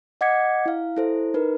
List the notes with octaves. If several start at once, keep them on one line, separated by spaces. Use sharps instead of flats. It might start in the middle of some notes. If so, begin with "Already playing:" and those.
D#5 F#5 D6 G#6 B6 C#7
E4 F5
E4 A4 C5
D#4 A#4 B4